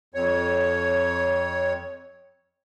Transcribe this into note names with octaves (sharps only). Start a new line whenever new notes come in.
F2 C#5